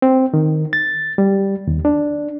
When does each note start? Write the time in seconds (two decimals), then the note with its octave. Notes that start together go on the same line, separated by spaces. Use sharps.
0.02 C4
0.34 D#3
0.73 A6
1.18 G3
1.67 D#2
1.85 D4